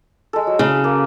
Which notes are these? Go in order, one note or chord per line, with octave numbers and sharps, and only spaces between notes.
G#3 A4
F#3
C#3
A#3